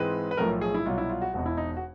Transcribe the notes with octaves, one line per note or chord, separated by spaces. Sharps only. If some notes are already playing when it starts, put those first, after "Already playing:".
Already playing: G#2 E3 G#3 C4 B4
B4
B1 A2 F3 A3 A#4
G#4
E4
C2 B2 F#3 F4
E4
F4
F#4
E1 E2 B2 F#4
E4
D#4
F#4